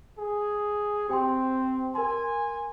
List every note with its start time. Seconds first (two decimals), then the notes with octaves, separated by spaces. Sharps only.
0.19 G#4
1.09 C4 G4 G5 C6
1.95 A#4 G#5 C6